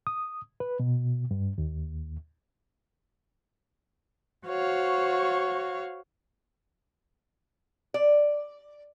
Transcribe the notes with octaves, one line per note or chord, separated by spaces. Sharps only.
D#6
B4
B2
G2
D#2
F#4 C5 C#5 F5
D5